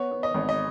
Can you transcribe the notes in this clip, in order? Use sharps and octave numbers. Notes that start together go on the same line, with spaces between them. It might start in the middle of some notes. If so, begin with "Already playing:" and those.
Already playing: B3 C#5
B3
D#5
G#1
D#5